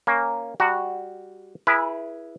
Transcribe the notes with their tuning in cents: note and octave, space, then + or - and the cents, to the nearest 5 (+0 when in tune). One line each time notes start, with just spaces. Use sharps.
A#3 +0 C#4 +5
G3 +10 F#4 +0 A#5 -30
E4 +10 G#4 -5 B4 -30